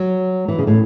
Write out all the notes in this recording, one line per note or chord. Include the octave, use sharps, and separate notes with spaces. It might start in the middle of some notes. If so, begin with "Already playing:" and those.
Already playing: F#3
E3
C#3
A2